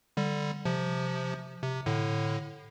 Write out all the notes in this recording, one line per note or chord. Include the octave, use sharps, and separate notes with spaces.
D3 G3
C3 F3
C3
A2 D3